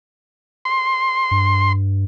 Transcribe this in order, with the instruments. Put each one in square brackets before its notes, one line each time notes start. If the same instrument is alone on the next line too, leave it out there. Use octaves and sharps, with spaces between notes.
[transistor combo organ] C6
[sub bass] G2